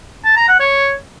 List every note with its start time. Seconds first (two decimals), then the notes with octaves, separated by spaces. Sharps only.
0.25 A5
0.36 A#5
0.48 F#5
0.60 C#5